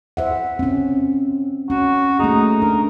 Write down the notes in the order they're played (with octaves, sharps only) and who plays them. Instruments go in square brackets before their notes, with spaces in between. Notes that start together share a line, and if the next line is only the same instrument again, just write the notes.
[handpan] C5 E5 F#5
C4 C#4
[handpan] C#4 [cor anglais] F#4
[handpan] A3 A#3 G#4 [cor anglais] D#4
[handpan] D4 [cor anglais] A#4